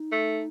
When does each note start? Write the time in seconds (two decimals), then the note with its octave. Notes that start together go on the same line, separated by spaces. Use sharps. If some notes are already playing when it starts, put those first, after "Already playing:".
Already playing: D#4
0.12 A3